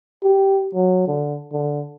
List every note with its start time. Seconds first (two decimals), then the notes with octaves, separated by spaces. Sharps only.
0.23 G4
0.74 F#3
1.07 D3
1.52 D3